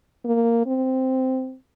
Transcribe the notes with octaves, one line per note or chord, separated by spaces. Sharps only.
A#3
C4